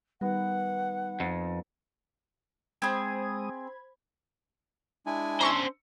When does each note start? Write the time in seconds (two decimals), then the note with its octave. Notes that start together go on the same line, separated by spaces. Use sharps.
0.21 D#3 G3 B3 G#4 F#5
1.20 F2
2.82 G#3 C4 G#4 C5 B5 D#6 G#6
5.06 G#3 D4 E4 G#5
5.41 C#4 C5 A#5 C#6 E6